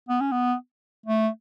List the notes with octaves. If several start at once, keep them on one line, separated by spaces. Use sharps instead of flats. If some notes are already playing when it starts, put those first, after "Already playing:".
B3
C#4
B3
A3